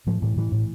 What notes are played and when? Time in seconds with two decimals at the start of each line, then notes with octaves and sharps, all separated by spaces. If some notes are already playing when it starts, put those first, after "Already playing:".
0.07 A2 F3
0.22 A2 E3
0.37 A2 E3
0.52 A2